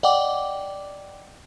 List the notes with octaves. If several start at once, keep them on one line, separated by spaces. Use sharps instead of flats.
D5 D#5 F#5 G5 D6